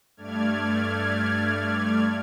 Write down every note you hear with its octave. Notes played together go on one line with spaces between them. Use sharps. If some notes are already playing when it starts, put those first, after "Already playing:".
G2 A3 D5 F6 G#6